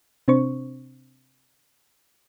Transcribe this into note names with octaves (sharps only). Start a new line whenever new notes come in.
C3 C4 D4 C5 C#6